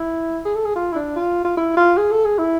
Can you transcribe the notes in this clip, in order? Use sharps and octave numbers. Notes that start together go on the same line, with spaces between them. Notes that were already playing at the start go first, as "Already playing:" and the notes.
Already playing: E4
G#4
A4
G#4
F4
E4
D4
F4
F4
E4
F4
G#4
A4
G#4
E4